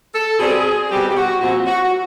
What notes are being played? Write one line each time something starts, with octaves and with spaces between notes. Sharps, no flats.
A4
B2 G3 C4 G#4
B2 G3 C4 G4
G4
F#4
A#2 F3 G#3 C4 F#4
F#4
F#4